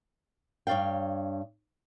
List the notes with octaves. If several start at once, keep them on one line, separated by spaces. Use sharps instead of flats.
G2 C#5 D5 F5 G5